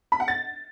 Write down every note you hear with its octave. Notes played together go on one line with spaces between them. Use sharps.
B5
F#5
A6